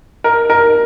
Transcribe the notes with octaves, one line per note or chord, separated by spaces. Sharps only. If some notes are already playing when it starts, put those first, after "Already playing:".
A#4
A#4